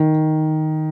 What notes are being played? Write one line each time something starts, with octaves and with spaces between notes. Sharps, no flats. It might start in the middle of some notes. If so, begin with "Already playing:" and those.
Already playing: D#3